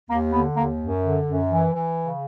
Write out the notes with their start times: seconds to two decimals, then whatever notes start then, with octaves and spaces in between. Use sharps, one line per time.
0.09 D#2 A#3
0.33 D3 B3
0.56 D#2 A#3
0.80 F#2
1.03 D3
1.27 F#2
1.50 E3
1.74 E3
1.97 C#3